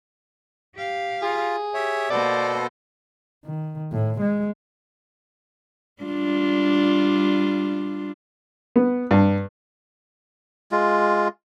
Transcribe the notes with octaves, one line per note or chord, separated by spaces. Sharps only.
G4 F5
F4 G#4
G4 C#5 E5
B2 A#3 B3 A4 C5 D5
D#3
A2
G#3
G3 D4 F4
B3
G2
G#3 F4